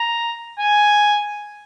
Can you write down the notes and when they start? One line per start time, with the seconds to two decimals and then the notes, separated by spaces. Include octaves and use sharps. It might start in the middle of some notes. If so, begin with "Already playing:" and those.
Already playing: A#5
0.59 G#5